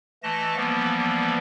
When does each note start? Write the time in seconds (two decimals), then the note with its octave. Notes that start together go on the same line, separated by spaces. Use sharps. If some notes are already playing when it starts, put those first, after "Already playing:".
0.23 E3 A3 D#5 A5 A#6
0.56 E3 F3 G3 A#3 B3